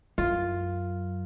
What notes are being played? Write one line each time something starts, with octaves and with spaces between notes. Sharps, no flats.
F#2 F4